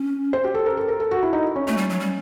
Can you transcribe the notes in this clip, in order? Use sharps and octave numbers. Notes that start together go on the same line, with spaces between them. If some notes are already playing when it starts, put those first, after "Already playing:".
Already playing: C#4
C5
G4
A4
A#4
A4
A#4
A4
F#4
E4
D#4
C#4
A3 C#4
G3
F#3
G3